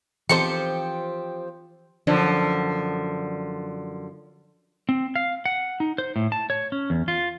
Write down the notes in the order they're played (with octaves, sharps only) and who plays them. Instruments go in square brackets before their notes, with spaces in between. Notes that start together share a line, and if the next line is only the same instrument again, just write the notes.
[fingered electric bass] E3 [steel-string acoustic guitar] F3 C4 G4 [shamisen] D#4 A4 C5 [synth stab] C#7
[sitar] F#2 D3 F3
[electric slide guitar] C4
F5
F#5
D#4
C5
A2
A5
C#5
C#4
E2
F4